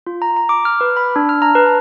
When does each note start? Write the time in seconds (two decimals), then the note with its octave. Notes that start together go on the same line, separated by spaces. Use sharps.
0.07 F4
0.22 A#5
0.37 A#5
0.49 D6
0.65 F6
0.81 B4
0.97 B5
1.16 D4
1.29 F6
1.42 A#5
1.55 B4
1.66 A5